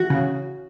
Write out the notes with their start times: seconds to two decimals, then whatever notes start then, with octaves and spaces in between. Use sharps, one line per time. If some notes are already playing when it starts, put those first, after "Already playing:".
Already playing: E3 F#4
0.10 C#3